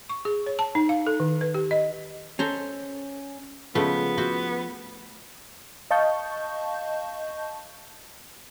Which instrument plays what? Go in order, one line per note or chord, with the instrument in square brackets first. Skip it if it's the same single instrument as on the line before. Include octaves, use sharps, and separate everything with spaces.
[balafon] C#6
G#4
C#5
A5
D#4
F5
A4
D#3
B4
G4
D#5
[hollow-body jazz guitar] C#4 [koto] A4 C5 A#5
[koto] C#3 G#3 A3 [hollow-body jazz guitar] F3 [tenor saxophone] B3
[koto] F#4 C5 E5
[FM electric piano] D#5 F5 A5 C#6 G6